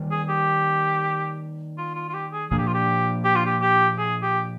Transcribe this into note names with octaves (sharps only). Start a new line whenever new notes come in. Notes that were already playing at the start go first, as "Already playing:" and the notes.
Already playing: D#3 G3 A#3
G#4
G4
F4
F4
F4
G4
G#4
A#2 F3 A#3 D4 G#4
G4
F4
G4
G4
F4
G4
G4
G#4
G4